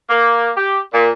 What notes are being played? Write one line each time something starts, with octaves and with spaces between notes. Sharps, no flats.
A#3
G4
A#2